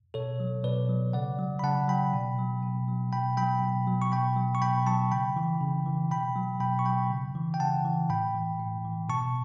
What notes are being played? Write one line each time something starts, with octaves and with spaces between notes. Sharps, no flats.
B2 A4 C#5
F#3
B2 B4 D5
F#3
C#3 D5 F#5
F#3
B5
C#3 F#5 A5
F#3 G5 B5
B2
F#3
B2
F#3
B2 G5 B5
F#3 G5 B5
B2
F#3
C#6
B2 G5 B5
F#3
C#6
B2 G5 B5
F#3 A5 C#6
C#3 G5 B5
E3
C#3
E3
B2 G5 B5
F#3
B2 G5 B5
C#6
F#3 G5 B5
C#3
E3
G5
C#3 F#5 A5
E3
A2 G5 B5
E3
A2
E3
B2 A5 C#6